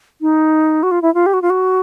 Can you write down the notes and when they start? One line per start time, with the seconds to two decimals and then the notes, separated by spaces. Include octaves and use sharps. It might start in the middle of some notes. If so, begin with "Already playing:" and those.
0.21 D#4
0.83 F#4
0.91 F4
1.02 E4
1.14 F4
1.26 G4
1.34 F#4
1.42 F4
1.50 F#4